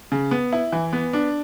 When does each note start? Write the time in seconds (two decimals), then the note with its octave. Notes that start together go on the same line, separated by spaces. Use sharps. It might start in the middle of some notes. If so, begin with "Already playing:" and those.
0.12 C#3
0.31 B3
0.53 E4
0.72 E3
0.93 B3
1.13 D4